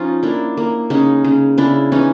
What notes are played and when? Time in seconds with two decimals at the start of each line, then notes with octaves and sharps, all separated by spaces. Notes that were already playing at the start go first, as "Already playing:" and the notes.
Already playing: F3 C#4 D#4 F4
0.23 A#3 D4 E4
0.57 A#3
0.90 C#3 C#4 D#4
1.24 C#3
1.58 C#3 D4 E4
1.92 E3 C#4 D#4